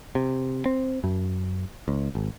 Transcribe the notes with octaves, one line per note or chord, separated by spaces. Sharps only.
C3
C4
F#2
C#2
G#1